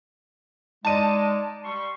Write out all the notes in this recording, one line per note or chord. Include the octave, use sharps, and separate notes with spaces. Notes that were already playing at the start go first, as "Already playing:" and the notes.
G#3 D#4 D5 A5 D#7
G3 C6 C#6